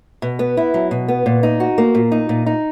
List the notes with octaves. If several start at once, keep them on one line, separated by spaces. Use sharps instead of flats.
B2
B3
E4
F#3
B2
B3
A#2
D#4
F#4
A#3
A#2
D#4
A#2
D#4